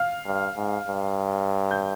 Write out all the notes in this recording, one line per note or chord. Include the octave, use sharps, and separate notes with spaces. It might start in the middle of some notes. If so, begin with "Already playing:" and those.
Already playing: F5 F6
G2
G#2
G2
G6